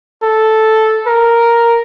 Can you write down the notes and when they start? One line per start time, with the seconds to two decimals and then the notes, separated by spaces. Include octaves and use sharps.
0.23 A4
1.07 A#4